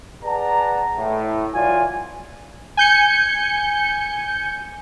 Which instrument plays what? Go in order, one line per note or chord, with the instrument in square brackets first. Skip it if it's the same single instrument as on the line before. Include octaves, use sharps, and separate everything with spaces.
[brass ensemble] G#4 B4 D5 F#5 A5 A#5
A2
E3 F#3 F4 D5 G#5
[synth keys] G#5 G6 C#7